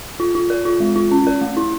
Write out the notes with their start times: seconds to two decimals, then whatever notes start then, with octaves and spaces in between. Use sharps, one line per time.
0.20 F4
0.35 F4
0.50 A#4
0.65 F4
0.80 G#3
0.96 F4
1.11 C#4
1.27 A#4
1.41 A3
1.57 E4